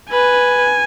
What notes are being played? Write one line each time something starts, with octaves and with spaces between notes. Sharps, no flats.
B4 G#5